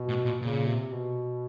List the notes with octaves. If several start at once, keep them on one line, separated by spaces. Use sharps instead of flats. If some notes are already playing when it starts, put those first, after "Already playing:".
Already playing: B2
A2
A#2
A#2 C#3
C3
B2